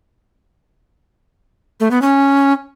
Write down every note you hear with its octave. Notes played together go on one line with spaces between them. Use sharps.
A3
B3
C#4